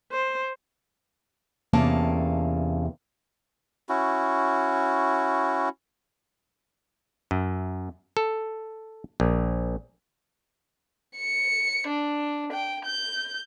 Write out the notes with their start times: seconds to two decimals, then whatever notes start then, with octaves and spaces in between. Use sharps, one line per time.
0.12 C5
1.73 E2 C3 A#3 C#4 F5 A5
3.89 C#4 E4 F#4
7.31 F#2
8.17 A4
9.20 A#1
11.17 C#7
11.88 D4
12.53 G5
12.86 G6